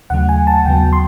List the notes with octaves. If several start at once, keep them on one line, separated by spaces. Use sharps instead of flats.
D#2 C#3 F#3 A3 F#5
G#5
A5
D#2 C#3 F#3 B3 G5
C6